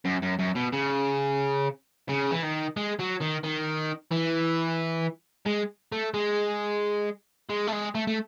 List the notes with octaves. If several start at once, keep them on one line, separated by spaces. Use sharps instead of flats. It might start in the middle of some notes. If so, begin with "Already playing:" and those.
F#2
F#2
F#2
B2
C#3
C#3
E3
D#3
G#3
F#3
D#3
D#3
E3
G#3
A3
G#3
G#3
A3
G#3
A3
A3